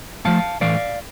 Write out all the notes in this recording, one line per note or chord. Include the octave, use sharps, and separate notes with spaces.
A2 F3 A3 F5 A5
A2 E3 A3 D5 F5